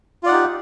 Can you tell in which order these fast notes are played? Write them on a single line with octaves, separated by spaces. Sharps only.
F4 D5 F#5 D#4 G4